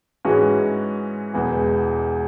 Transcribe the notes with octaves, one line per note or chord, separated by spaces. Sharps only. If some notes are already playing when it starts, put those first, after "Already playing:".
G#2 E3 G#3 C#4 F#4
E1 E2 E3